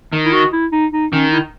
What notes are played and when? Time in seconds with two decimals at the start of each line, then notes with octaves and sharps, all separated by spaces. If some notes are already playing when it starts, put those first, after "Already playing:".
0.13 D#3
0.25 E4
0.33 F#4
0.53 E4
0.72 D#4
0.92 D#4
1.12 D#3 C#4
1.33 E4